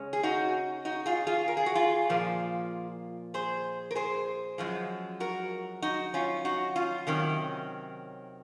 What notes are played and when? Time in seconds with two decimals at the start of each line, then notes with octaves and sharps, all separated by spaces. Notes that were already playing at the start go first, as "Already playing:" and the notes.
Already playing: C#3 G#3 C#4
0.13 G#4
0.23 D#4 F#4
0.85 D#4 F#4
1.06 F4 G#4
1.27 F4 G#4
1.48 A#4
1.57 G#4
1.66 F#4
1.75 F4 G#4
2.09 A#2 F3 A#3
3.34 G#4 C5
3.91 A#4
3.95 G#4 C5
4.58 F#2 F3 G#3
5.20 F#4 A#4
5.82 D#4 F#4
6.14 C#4 F4
6.45 D#4 F#4
6.76 C#4 F4
7.07 C3 D#3 F#3 C#4